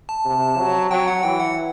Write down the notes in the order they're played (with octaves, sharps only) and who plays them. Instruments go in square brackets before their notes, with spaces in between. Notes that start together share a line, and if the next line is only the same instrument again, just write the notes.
[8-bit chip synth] A5
[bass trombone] C3
F#3
[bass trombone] F#3 [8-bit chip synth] G5
[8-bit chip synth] F#5
[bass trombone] E3 [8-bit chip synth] G5
[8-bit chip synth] F#5